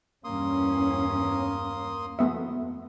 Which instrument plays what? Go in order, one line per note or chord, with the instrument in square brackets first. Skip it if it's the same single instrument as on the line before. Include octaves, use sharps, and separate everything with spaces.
[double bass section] E2 G2 C#4 [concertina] A#3 C6 D#6
[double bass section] F2 [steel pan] A3 B3 E5